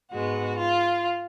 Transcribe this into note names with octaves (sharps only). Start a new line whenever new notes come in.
G#2 G#3 B3 F#4
F4